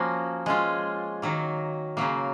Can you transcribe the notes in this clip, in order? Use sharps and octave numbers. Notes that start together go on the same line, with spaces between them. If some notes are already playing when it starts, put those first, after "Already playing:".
Already playing: F3 A#3 C#4 F#4
G#3 C#4 F4
D#3 F#3 A#3
C#3 F#3 A#3